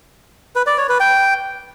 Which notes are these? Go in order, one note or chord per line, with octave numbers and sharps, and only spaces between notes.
B4
D5
C#5
B4
G5